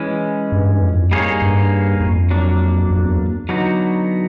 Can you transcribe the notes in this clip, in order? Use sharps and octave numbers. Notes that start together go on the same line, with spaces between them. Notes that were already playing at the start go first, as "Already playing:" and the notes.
Already playing: E3 G#3 C#4
G2
F2
G3 A#3 D#4 G#4 C#5
G2
F2
F#3 A#3 D4
F2
E2
D3 F#3 B3 D#4 F#4